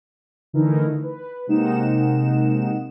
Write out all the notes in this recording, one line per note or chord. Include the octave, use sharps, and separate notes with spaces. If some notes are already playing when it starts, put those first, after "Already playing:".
D3 E3 A3 D#4 E4 A#4
B4
C3 G#3 A#3 D#4 F#5 E7